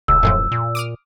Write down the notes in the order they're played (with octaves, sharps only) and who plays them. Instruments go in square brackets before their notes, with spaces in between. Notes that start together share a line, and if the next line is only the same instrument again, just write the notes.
[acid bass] D#1 [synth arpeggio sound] C#2 [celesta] E6
[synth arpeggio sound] F#2 A2 F3
[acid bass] A#2
[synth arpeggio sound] D6 D#6 F6